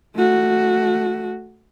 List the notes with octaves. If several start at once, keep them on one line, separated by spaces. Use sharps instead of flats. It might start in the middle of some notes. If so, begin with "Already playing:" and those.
A3 F#4